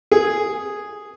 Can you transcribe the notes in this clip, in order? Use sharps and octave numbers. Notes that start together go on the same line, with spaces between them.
G#4